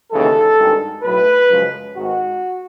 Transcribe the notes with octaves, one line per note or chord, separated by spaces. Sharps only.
D#2 C#3 E3 G#3 A4
G#1 G2 D#3 G#3
B1 A2 F#3 B4
F#2 C#3 F3 G#3
G#1 G#2 D#3 F#4